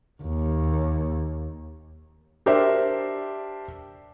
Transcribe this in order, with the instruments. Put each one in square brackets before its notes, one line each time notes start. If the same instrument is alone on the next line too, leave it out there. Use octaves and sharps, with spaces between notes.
[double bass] D#2
[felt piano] D4 G4 A#4 C5 D5 E5